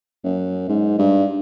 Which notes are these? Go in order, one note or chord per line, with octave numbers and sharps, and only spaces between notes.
F#2
G#2
G2